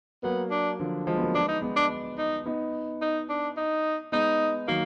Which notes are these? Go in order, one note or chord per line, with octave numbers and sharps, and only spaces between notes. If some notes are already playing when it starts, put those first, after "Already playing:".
F#3 A#3 B3
D4
D3 F3
F3 G#3
B3
F#3 A#3
G#3 B3 D4
D#4
G#3 B3
D4
D#4
B3 D#4
D#4
D4
D#4
G#3 B3 D#4
D#3 F#3 A#3